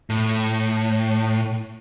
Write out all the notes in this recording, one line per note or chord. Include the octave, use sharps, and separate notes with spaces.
A2